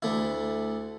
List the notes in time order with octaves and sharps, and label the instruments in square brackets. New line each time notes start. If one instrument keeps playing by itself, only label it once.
[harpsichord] D2 A3 E4